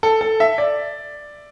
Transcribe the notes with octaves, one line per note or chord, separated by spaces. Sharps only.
A4
A4
E5
D5